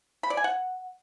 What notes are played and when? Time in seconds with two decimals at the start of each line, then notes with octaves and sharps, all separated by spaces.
0.23 B5
0.30 D5
0.37 G#5
0.44 F#5